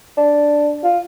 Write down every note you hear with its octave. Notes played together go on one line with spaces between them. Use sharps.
D4
F4